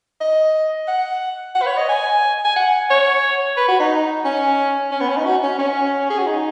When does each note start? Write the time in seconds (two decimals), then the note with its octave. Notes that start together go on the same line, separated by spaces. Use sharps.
0.21 D#5
0.88 F#5
1.55 F#5
1.62 B4
1.66 C#5
1.77 D#5
1.89 G#5
2.44 G#5
2.56 F#5
2.90 C#5
3.57 B4
3.68 F#4
3.80 D#4
4.25 C#4
4.92 C#4
5.00 B3
5.09 C#4
5.17 D#4
5.25 F#4
5.43 C#4
5.59 C#4
6.10 G#4
6.19 F#4
6.26 D#4